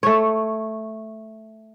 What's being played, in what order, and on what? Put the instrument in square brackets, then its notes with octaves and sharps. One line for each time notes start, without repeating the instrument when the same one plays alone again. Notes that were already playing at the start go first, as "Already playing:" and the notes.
[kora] A3 C#5